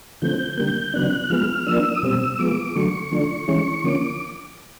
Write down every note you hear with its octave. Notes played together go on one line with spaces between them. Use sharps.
D3 F3 A3 C4 G6
D3 G3 A#3 G6
C#3 F#3 B3 D4 F#6
F3 G#3 B3 F6
F3 A#3 D4 E6
D#6
B2 G3 C4 E6
F3 G#3 B3 D6
D3 F#3 A3 C#6
D3 F3 A3 D4
E3 G#3 C#4 C#6
D3 F3 A#3 C#4 D6